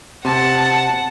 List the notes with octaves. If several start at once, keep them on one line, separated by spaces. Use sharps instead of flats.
C3 F#5 A5